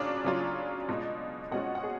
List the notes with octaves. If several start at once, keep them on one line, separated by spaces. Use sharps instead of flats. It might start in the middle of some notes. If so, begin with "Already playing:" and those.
Already playing: C#3 F#3 C#4 D4 F4 D5
C#3 F#3 C#4 F4
B2 G#3 C#4 F4
B2 G#3 C#4 F4 F#4 F#5
F#5
G#4